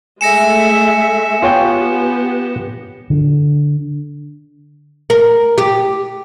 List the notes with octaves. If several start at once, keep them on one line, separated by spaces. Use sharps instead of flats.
G#3 A3 E5 G#5 A#6 C#7 E7
B3 F4 G4 C#5 G5
D3
A#4
G4